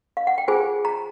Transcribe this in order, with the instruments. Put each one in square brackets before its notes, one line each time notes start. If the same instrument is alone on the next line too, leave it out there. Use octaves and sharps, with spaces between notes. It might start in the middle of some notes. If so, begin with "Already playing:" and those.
[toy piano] F5
F#5
G5
F4 G#4 C5 G#5
A#5